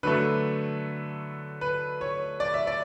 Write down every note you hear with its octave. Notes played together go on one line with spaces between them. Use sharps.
D3 F#3 A3 B4
B4
C#5
D5
E5
D5